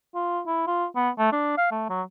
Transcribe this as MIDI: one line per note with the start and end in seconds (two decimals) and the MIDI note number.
0.15 0.41 65
0.47 0.66 64
0.67 0.86 65
0.96 1.10 59
1.18 1.31 57
1.33 1.56 62
1.58 1.67 77
1.71 1.86 57
1.89 2.02 54